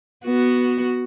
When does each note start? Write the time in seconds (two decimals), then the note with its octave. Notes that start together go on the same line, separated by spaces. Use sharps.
0.25 B3 F#4